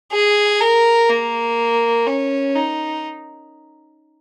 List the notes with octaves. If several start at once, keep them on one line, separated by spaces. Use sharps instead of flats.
G#4
A#4
A#3
C#4
D#4